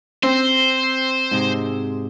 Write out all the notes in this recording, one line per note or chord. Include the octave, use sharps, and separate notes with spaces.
C4 C5
G#2 C3 G#3